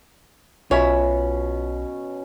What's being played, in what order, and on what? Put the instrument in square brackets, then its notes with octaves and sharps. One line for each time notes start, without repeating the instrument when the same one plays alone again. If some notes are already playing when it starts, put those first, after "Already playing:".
[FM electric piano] B1 [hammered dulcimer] B2 C#4 B5 [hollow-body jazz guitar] F4 E5 [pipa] C#5